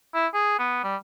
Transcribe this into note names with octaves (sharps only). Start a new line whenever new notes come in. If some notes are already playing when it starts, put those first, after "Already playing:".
E4
G#4
B3
G3